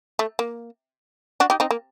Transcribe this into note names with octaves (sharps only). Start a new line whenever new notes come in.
A3
A#3
D4 F#4
D#4 G4
C4 D#4
A#3